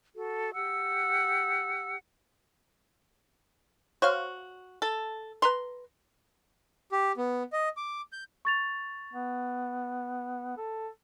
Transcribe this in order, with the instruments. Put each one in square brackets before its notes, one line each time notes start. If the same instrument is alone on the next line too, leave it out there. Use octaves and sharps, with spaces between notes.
[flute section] F#4 A4
G4 F#5 E6
[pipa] F#4 [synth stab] C5 C#5 F5
[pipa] A4 [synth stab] A6
[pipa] B4 A#5 C6
[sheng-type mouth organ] G4
B3
D#5
D6
G6
[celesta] C#6 A6 F7
[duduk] B3
A4